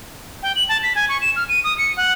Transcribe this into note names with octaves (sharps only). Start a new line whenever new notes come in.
G5
F#7
A5
B6
G#5
C#6
E7
F6
D#7
D#6
C#7
F#5